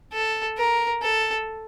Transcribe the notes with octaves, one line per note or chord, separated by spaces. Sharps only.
A4
A#4
A4